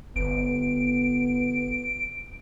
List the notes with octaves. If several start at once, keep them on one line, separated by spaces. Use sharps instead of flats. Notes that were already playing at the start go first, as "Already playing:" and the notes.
G1 B3 D7